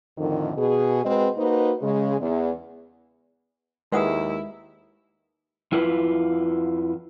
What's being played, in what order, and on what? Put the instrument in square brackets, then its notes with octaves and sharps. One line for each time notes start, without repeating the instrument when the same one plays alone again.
[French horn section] F2 A2 D3 D#3
B2 G#4
G#3 C4 F#4 B4 D#5
A#3 D#4 F#4 B4 C5
C#3 G#3
E2
[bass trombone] D#2 [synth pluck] G#3 [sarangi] E4 [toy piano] B4 F#5 D#6
[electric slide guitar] F2 E4 F4 B4